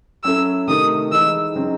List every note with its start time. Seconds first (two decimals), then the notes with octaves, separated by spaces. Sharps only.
0.24 F#3 C#4 E4 A4 E6
0.67 C3 D#3 A3 D#6
1.12 E3 G#3 D#4 E6
1.55 C#3 F#3 C4 D#4